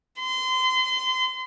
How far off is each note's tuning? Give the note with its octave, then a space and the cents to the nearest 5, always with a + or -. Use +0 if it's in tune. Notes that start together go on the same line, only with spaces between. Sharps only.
C6 -30